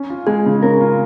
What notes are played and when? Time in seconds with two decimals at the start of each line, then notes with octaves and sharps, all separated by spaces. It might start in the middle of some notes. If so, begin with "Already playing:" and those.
Already playing: C#4
0.10 F4
0.27 G#3 G#4
0.46 C#3
0.63 C#4 A#4
0.81 F4